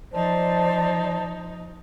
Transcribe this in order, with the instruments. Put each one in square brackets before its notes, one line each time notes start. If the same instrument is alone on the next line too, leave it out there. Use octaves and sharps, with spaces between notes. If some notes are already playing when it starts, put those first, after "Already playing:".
[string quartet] F3 D#4 [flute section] C5 D5 A5